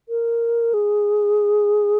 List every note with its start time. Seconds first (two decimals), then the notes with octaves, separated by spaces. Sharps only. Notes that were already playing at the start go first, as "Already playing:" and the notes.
0.09 A#4
0.74 G#4